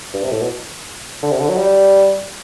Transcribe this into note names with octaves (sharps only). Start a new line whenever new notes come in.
G2
C3
A2
B2
D3
C3
D3
F#3
G3